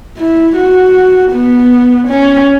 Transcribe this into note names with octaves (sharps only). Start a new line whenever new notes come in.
E4
F#4
B3
C#4